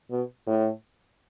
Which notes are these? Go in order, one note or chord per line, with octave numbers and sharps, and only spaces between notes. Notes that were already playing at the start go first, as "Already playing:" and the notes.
B2
A2